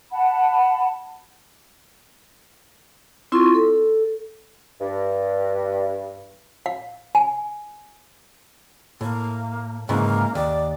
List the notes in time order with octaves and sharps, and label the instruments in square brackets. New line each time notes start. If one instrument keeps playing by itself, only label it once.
[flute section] F#5 A5 B5
[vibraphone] C4 E4 F4 C6 C#6
A4
[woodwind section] G2
[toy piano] F5
G#5
[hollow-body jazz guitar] A2 [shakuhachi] A#3
[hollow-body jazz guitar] G#2 C#3 E3 [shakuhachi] A#3
[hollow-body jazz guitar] D#2 [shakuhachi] D5